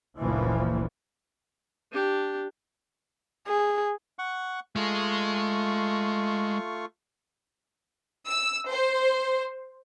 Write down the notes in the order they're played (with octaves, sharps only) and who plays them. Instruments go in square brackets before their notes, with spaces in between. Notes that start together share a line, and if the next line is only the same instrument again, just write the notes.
[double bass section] F#1 D2 A#2 E3 F3
[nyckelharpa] D4 G4
[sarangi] G#4
[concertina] F#5 C#6
[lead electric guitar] G#3 [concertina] A3 F4 C#6
[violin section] E6
C5